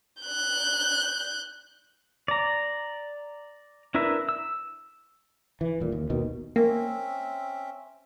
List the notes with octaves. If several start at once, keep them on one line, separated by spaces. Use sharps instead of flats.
F#6 G6
D5 A#5
D4 E4 A#4 B4 E5
E6
E3
D#1 A#2
D#2
D#2 B2 D#3
A#3 C4 C#4 E5